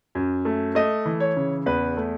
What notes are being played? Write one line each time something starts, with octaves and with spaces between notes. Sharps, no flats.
F#2
A3
A3 D#5
E3
C#5
C#3
E2 B4
A3